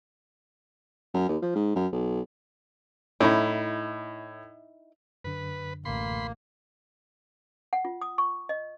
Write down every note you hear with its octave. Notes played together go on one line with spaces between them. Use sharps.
F#2
D#2
F3
G#2
F#2
B1
A2 D#4 E4
F#2 D3 B4
A1 A#3 B5 C6
F#5
F4
D#6
C#6
D#5